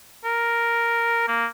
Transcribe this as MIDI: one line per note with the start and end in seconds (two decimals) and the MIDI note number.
0.25 1.28 70
1.28 1.46 58